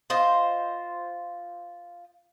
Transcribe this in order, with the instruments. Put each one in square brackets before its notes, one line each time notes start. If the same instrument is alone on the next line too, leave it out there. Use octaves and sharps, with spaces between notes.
[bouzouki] F4 C5 D#5